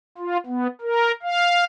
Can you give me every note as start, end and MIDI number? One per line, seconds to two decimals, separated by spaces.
0.18 0.37 65
0.46 0.67 59
0.81 1.12 70
1.23 1.64 77